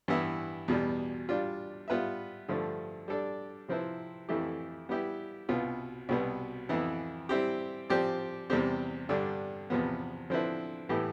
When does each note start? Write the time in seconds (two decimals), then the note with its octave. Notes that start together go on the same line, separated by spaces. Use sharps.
0.08 G2 E3 B3 E4
0.68 E2 B2 G3
1.29 G3 D4 F4
1.88 G3 B3 F4 B4 E5
2.49 G2 D3 F3 A3
3.08 G3 D4 A4 D5
3.68 C3 F3 C4 E4 B4
4.29 F2 E3 A3 E4 G4
4.89 G3 B3 E4 G4
5.49 C2 B2 B3 F4
6.09 C2 B2 G3 B3
6.69 F2 E3 B3 E4
7.29 G3 C4 E4 G4
7.90 F3 C4 G4 D5
8.50 E2 C3 G3 C4 G4
9.09 G2 D3 G3 D4
9.70 E2 C3 F3 B3
10.30 D3 F3 C4 E4 B4
10.89 A2 E3 B3 E4 G4